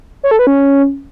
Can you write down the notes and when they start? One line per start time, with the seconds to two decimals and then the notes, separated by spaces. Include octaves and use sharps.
0.24 C#5
0.31 A4
0.39 B4
0.47 C#4